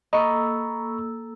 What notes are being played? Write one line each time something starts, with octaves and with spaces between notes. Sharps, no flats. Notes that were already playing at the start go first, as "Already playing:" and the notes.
A#3 A4 D#5 A#5 B5 C#6 E6